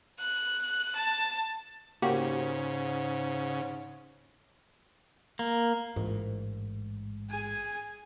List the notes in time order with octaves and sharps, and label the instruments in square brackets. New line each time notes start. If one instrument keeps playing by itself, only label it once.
[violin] F#6
A5
[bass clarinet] G#2 [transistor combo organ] C#3 [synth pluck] A#3 F#4 G4
[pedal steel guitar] A#3
[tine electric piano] A1 [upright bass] G#2
[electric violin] G#4 G#5